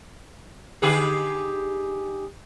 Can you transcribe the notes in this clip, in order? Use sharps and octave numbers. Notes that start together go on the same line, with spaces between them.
D3 G4 G#4